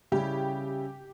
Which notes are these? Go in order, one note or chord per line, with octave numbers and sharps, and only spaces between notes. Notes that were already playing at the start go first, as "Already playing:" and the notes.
C#3 G3 C#4 E4 G4